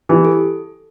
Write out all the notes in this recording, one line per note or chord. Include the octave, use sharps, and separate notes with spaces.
E3 G4
A4